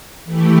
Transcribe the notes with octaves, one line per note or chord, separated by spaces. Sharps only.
E3 A3 E4 G4